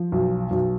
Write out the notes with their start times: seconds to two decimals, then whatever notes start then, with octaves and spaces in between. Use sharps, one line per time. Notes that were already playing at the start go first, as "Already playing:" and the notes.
Already playing: F3
0.12 B1
0.51 B1